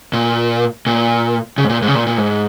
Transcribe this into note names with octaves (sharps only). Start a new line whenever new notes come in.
A#2
A#2
C#3
G#2
A#2
G#2
C#3
A#2
A#2
G#2